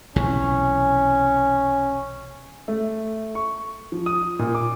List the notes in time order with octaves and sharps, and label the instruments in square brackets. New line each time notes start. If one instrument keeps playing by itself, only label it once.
[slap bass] B1 C3 E3 [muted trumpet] C#4
[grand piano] A3
C#6
F3
D#6
A#2
D6